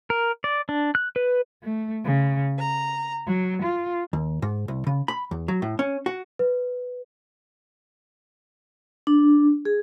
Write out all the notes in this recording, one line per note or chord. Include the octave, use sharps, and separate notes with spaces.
A#4
D5
D4
F#6
B4
A3
C#3
A#5
F#3
F4
D#2
G#2
C2
C#3
B5
E2
F#3
A2
C#4
F#4
B4
D4
G#4